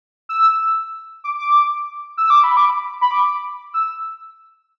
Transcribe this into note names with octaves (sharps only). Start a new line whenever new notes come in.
E6
D6
D6
E6
D6
B5
D6
B5
D6
E6